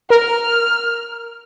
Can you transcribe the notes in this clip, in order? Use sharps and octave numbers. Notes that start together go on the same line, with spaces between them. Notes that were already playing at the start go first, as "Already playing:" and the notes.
A#4 F6